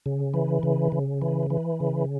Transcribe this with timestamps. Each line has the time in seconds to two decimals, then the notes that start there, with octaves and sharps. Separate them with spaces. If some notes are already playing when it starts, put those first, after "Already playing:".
0.06 C#3
0.34 E3
0.63 C#3
0.92 C#3
1.22 E3
1.50 E3
1.80 C#3